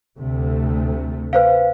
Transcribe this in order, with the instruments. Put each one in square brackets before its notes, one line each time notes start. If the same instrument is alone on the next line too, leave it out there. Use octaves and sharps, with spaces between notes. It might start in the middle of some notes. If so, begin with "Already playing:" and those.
[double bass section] D2 C3 A3
[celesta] B4 C5 F5